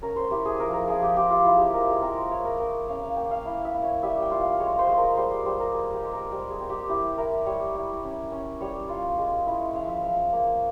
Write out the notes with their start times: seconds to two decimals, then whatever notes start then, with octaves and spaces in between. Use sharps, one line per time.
0.02 C#4 A#4
0.16 C5
0.31 E4 G4
0.45 G#4
0.59 F3 A#4
0.73 A#4
0.88 F3 G#4
1.02 G4
1.16 C4 G4
1.30 F4
1.45 E4 F4
1.55 G4 G#4
1.74 G#3 A#4
1.91 G#4
2.02 C4 A#4
2.31 E4 C#5
2.45 A#4
2.59 C4 A#4
2.88 C#4 F5
3.03 F5
3.16 A#3 G5
3.31 F5
3.46 E4 F5
3.65 E5
3.74 E4
3.84 C#5
4.03 G3 E5
4.22 G5
4.31 F4
4.41 F5
4.60 G#3 C#5
4.79 C5
4.89 G#3
4.94 A#4 C5
5.17 G3 C5
5.46 G3 C5
5.60 A#4
5.74 G#3 G#4
5.93 G4
6.03 G#3
6.13 A#4
6.31 G3 C5
6.50 G#4
6.60 C4
6.70 G4
6.89 E4 G4
7.17 E4 A#4
7.46 G3 C#5
7.75 E4
8.03 C#4
8.32 C#4
8.61 G3 C#5
8.89 F4
9.18 G#3
9.47 E4
9.75 F3 F5
9.89 E5
10.02 F3 F5
10.32 A#3